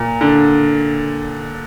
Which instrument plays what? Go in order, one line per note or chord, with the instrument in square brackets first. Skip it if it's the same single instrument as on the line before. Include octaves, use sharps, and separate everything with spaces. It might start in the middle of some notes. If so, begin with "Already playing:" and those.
Already playing: [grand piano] A#2
D3